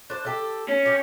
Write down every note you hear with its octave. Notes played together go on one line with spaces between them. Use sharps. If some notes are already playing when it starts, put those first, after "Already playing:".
D4 C5
G4 A4
C#4
G4